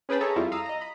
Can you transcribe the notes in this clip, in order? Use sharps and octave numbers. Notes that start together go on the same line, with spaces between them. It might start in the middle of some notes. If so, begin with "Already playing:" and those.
C#4 G#4 B4 G5 A5 B5
G#4 A4 C#5 E5 A5 A#5
F2 G3 E4 F4
F5 A#5 D#6 E6
D#5 A#5
B5